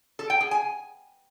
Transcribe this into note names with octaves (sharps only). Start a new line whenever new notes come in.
A4
G5
G#4
G#5